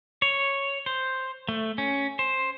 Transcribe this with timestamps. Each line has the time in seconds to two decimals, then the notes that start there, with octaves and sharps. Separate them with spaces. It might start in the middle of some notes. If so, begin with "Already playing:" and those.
0.22 C#5
0.86 C5
1.49 A3
1.78 C#4
2.19 C5